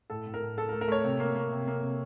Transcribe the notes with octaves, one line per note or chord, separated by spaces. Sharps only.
A2 A4
A2
A#4
A2
A3 A4
A#4
A3
A#4
A3 C#5
C3
A#3
A#3
C3
A#3
C3